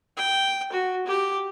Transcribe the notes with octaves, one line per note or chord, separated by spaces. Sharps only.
G5
F#4
G4